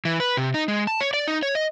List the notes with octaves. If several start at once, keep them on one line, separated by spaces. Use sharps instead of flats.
E3
B4
C3
D#4
G#3
A5
C#5
D5
D#4
C#5
D#5